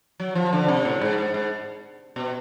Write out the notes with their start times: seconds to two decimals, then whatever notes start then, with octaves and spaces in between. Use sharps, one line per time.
0.20 F#3
0.35 F3
0.53 D3
0.68 C3
0.85 A2
1.01 G#2
1.18 G#2
1.34 G#2
2.16 B2